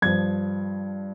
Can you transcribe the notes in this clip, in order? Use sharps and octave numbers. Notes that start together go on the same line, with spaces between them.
G2 F3 G#6